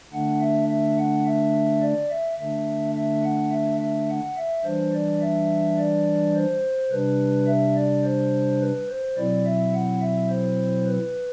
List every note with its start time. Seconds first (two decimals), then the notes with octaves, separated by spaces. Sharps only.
0.13 D3 A3 D4 F#5
0.41 E5
0.69 E5
0.98 F#5
1.26 E5
1.82 D5
2.10 E5
2.39 D3 A3 D4 E5
2.95 E5
3.24 F#5
3.51 E5
3.81 E5
4.09 F#5
4.37 E5
4.64 E3 G3 D4 C5
4.93 D5
5.21 E5
5.78 D5
6.35 C5
6.91 C3 G3 D4 B4
7.47 E5
7.76 D5
8.04 C5
8.60 B4
8.89 C5
9.17 B2 F#3 C4 E4 D5
9.45 E5
9.74 F#5
10.01 E5
10.29 C5
10.86 B4